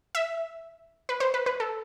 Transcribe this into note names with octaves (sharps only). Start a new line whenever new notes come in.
E5
B4
C5
B4
B4
A4